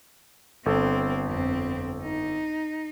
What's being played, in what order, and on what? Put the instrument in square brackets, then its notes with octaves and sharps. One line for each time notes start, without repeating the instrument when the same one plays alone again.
[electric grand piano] G1 A4 [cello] C4
[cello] F2 C4
D#4